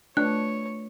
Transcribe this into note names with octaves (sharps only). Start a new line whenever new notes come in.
A3 D4 F4 B4 C#5 F#6